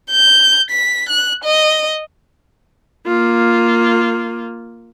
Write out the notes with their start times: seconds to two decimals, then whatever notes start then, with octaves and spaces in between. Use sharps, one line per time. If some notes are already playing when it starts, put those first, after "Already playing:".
0.11 G6
0.71 B6
1.09 F#6
1.44 D#5
3.06 A#3 F4